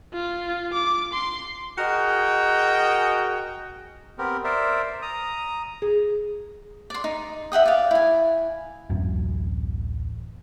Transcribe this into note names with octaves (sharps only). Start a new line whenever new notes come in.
F4
D6
C6
F#4 G#4 A#4 D#5 G5
B3 C4 G4 A#4
A#4 C5 D5 E5
A#5 D#6
G#4
D5 C6
D#4
E5 F#5 G5 D#6
D5 F5
E4 G#5
D1 A1 F#2